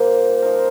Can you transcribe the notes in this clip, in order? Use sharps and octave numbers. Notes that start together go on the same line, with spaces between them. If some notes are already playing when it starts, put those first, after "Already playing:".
Already playing: A#2 G3 A#3 C5
F3 D#4 A#4